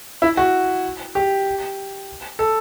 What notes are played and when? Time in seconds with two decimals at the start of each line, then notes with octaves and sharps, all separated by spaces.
0.22 E4
0.37 F#4
1.15 G4
2.39 A4